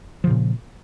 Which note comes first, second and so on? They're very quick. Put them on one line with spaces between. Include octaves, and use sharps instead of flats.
F3 C#3 A#2